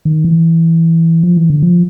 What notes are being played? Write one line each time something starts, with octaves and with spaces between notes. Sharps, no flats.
D#3
E3
F3
E3
D3
F3